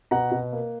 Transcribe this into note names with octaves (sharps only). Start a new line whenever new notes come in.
B2 F#5 A#5
B2
A#3